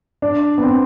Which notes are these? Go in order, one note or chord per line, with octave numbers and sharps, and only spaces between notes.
D4
B3
C4